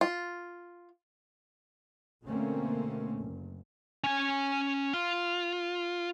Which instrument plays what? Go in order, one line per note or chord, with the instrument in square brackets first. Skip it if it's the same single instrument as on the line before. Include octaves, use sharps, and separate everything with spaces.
[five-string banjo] F4
[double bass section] B2 D3 A3 A#3 C4 C#4
F#1
[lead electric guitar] C#4 G#5
F4